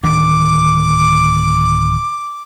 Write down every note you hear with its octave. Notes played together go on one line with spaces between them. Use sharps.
D1 D#3 D4 D6